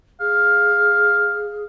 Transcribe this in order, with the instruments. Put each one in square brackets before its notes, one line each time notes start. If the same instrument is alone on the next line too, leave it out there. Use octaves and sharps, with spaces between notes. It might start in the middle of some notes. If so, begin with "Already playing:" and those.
[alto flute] G#4 [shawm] F5